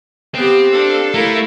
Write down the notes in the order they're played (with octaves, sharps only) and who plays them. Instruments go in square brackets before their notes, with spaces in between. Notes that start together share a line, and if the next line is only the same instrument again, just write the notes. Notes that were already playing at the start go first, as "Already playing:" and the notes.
[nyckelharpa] B3 G4 [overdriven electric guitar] C4 [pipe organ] F5
[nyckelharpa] D4 [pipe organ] A4 F5
[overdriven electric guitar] A3 [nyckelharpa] E4 A#4